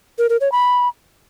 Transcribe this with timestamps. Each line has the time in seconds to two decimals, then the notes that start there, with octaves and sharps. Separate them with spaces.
0.19 A#4
0.30 A#4
0.41 C#5
0.52 B5